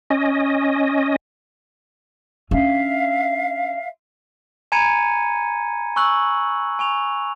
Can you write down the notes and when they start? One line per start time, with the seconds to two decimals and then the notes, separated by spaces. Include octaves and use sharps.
0.10 C#4 D#5
2.51 C#4 D4 E5 F5
4.72 G#5 A#5 B5 G#6 C#7 D#7
5.96 G#5 C#6 E6 F#6 F#7
6.79 G#5 C#6 F7